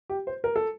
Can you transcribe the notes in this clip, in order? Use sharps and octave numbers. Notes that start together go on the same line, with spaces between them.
G4
C5
A#4
A4